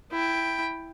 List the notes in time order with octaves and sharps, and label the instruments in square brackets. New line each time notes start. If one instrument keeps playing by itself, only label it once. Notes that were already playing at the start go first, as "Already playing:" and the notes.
[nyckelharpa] E4 G5